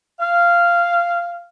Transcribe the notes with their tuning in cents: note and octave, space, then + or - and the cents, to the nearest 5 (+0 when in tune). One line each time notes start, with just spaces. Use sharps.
F5 -10